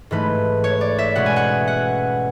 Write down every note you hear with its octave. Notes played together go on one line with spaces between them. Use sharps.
G#2 E3 A3 B4
C#5
D5
E5
B2 G#3 C#4 F#5
G#5
F#5
F#5